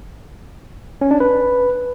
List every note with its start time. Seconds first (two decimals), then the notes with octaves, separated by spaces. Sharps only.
1.01 C#4
1.11 D4
1.20 B4